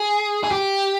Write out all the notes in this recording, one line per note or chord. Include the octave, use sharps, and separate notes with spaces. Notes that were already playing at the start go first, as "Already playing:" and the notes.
Already playing: G#4
G#4
G4